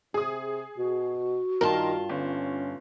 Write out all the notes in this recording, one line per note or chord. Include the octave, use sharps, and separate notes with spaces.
C3 G#4 D#6
B2 F#4
G2 D#3 F4 A#4 A5 C6
G1 C#4